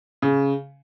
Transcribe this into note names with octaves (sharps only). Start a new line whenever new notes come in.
C#3